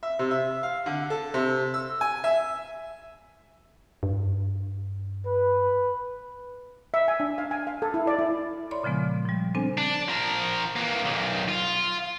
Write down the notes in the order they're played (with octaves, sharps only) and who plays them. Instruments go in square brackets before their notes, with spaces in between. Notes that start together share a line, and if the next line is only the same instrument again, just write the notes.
[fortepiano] E5
C3
E5
F5
D3
A4
C3
E6
G#5
E5
[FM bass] G2
[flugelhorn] B4
[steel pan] E5
G#5
D4
F5
G#5
F5
A4
E4
D5
E4
[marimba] C#5 D5 B5 C6
A#2 C#3 F3 G#3 B3
F3 G3
B3 C4 D4 A4 C5 G#5
[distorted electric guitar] D4
F3 A#4
E3 A#3
B1 D#3
F4